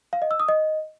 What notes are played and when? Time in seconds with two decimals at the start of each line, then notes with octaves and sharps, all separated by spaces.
0.13 F5
0.22 D#5
0.31 E6
0.40 D#6
0.49 D#5